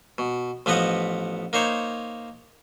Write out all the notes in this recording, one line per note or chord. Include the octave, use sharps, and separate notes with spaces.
B2
A1 F3 B3 B4 D#5 F#5
A#3 D#4 C5 C#5